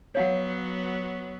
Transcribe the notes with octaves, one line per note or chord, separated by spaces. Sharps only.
F#3 B3 C#5 F5 F#5